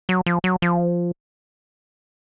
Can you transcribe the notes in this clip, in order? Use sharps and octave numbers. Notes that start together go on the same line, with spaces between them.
F#3
F3
F#3
F3